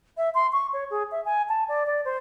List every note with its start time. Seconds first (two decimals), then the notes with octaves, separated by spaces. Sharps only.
0.17 E5
0.34 C6
0.53 C#6
0.73 C#5
0.90 G#4
1.12 E5
1.25 G#5
1.49 A5
1.69 D5
1.86 D5
2.05 C5